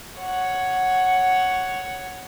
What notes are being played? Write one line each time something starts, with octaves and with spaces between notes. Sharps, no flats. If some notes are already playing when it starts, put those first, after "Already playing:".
C#5 F#5